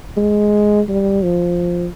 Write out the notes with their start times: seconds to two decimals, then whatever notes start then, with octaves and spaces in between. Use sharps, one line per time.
0.17 G#3
0.88 G3
1.23 F3